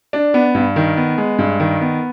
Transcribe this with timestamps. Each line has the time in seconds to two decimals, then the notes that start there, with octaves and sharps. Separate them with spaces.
0.13 D4
0.34 B3
0.55 G2
0.76 D#3
0.97 B3
1.18 G#3
1.38 G2
1.60 D#3
1.81 B3